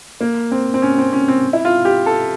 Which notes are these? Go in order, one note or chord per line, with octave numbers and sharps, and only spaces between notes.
A#3
C4
C4
C#4
C4
C#4
C4
E4
F4
G4
A4